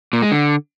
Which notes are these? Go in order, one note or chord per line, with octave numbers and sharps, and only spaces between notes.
A#2
G#3
D3